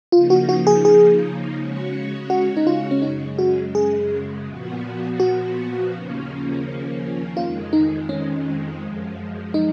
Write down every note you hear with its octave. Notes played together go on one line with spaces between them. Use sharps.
C#3 F3 A#3 D#4 F4
F#4
F#4
G#4
G#4
C#3 G#3 C#4 F#4 C#5
F#4
D#4
F4
C#4
F#2 C#3 G#3 D#4
F#4
G#4
A#2 F3 B3 F#4
F#4
D#2 C#3 F3 A#3 C#4
F2 D#3 G#3 F4
D#4
C#4
F#2 F3 G#3
D#4